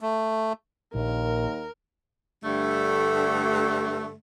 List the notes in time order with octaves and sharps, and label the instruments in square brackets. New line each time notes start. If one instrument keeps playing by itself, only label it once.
[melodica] A3
[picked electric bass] A#1 [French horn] D#2 [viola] A#4
[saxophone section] G2 D3 G3 A3